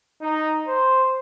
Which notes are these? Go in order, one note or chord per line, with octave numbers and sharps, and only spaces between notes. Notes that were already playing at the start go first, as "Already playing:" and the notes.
D#4
C5